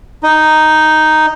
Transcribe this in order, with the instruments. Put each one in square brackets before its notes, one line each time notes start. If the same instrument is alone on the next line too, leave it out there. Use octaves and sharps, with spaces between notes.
[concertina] D#4